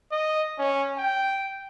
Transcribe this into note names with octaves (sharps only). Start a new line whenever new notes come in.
D#5
C#4
G5